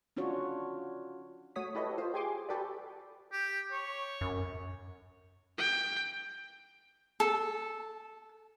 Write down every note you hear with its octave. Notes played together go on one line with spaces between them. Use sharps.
C#4 D4 F4 F#4 C#5
A3 F#4 C#5 D#6 B6
E4 G4 A4 B4 C#5 D#5
F4 C5
G4 G#4 G#5 C6 D6
F#4 G4 A4 B4 D5
G4
C#5
F#2
G5
A4